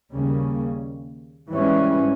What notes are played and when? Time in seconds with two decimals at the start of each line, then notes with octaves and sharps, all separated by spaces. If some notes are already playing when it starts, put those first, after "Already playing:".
0.11 D#2 C#3 G3 A#3 C#4
1.50 G#2 E3 G3 C#4